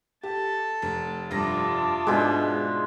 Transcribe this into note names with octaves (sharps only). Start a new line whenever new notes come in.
G4 A4 A5
F1
F1 G2 F4 E5 A5 D6 D#6 A#6
G#2 B2 G#3 D4